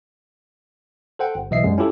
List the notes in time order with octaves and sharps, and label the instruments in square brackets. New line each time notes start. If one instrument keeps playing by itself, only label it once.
[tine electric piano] A4 C5 F#5 G5
G1
B1 E3 D#5 E5 C7
F#2 G3 G#3
C#4 E4 F4 G4 A4